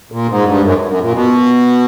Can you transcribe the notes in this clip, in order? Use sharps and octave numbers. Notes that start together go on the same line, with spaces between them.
A#2
G#2
G2
F#2
F#2
A#2
B2